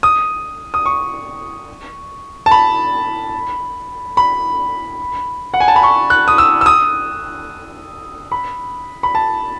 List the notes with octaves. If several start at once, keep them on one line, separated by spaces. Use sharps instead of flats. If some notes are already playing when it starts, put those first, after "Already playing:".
D#6
D#6
C#6
A5
B5
B5
F#5
G#5
A5
B5
C#6
F#6
D#6
E6
E6
D#6
B5
B5
A5